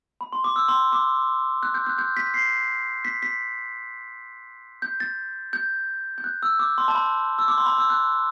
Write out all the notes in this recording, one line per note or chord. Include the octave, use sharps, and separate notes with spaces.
B5
C6
D6
E6
C6
D6
F#6
G6
F#6
G6
B6
C7
B6
B6
G6
A6
G6
G6
F#6
E6
D6
C6
A5
B5
E6
D6
C6
B5
E6
F#6